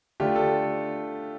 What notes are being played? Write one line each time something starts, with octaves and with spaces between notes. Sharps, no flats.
D3 A3 D4 F4 G4
A4